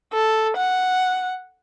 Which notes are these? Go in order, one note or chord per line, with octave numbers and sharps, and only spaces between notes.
A4
F#5